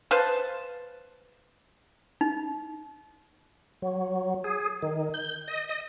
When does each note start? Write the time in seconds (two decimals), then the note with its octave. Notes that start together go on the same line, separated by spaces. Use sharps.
0.11 B4 C5 F5 A5
2.21 D#4
3.82 F#3
4.44 G#4
4.82 D#3
5.14 G6
5.48 D#5
5.69 D#5